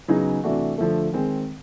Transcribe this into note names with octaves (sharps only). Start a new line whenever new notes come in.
C#3 F#3 B3 D#4 G#4
C3 E3 A3 D4 F#4
D3 F3 A3
D#3 G#3 C4